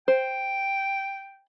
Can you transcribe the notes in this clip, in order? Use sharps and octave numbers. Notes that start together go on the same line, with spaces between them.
C5 G5